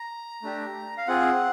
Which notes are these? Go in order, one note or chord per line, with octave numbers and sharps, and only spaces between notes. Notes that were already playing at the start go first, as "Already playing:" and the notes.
Already playing: A#5
A3 D4 G4
F5
C4 F4 G#4 F#5